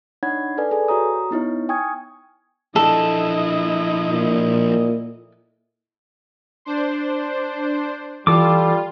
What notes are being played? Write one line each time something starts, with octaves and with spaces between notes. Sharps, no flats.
D4 D#4 C#5 F#5 B5 G#6
A4 B4 D5 G#5
G#4 A4 B4 G#5
F#4 C#5 A#5 D#6
B3 D#4 E4 C#5
G5 G#5 C#6 D#6 F6 G#6
F3 D4 E4 A4 D#5
A#2
D4 C5
E3 G3 F4 A4 D6